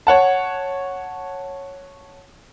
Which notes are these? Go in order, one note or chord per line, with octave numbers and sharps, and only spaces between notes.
C#5 F#5 A5